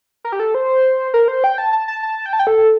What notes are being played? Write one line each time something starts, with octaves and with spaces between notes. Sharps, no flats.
A#4
G4
A4
C5
A#4
C5
G5
A5
A5
A5
A5
G5
A5
G5
A4